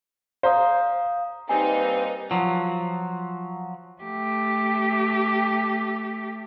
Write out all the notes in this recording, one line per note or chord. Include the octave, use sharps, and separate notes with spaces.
C5 F5 A#5 D#6
G3 A#3 C4 D#4 B4 G#5
F3 F#3
A3 G4